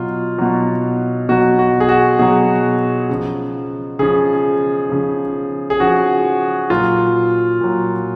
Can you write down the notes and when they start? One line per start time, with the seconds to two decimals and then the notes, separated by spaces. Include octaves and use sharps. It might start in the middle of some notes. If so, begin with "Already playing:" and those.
Already playing: B2 F#3 F4
0.38 B2 F#3
1.29 B2 F#3 F#4
1.59 F#4
1.80 G#4
1.89 F#4
2.19 B2 F#3 G#4
3.09 C#3 F3
3.99 C#3 F3 G#4
4.89 C#3 F3
5.70 G#4
5.80 C#3 F3 F#4
6.70 A#2 F#3 F4
7.61 A#2 F#3